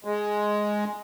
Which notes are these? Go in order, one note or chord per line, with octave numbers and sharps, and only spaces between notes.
G#3